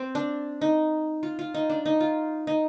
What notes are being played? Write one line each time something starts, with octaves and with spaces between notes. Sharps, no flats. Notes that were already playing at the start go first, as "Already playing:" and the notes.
Already playing: C4
D4
D#4
F4
F4
D#4
D4
D#4
F4
D#4